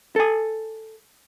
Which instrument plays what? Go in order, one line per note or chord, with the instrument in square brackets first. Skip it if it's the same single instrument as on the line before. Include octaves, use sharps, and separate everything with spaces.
[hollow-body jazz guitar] A4 G#5